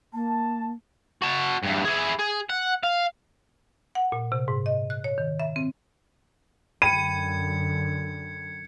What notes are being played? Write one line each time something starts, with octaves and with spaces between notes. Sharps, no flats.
A#3 A5
F#4 A5
E2 G2
E4 G#4
G#4
F#5
F5
F#5
A#2
C3
G#2
D#5
F#6
C#5
D#3
E5
C4
F#2 D3 G5 B5 G#6 C#7 D#7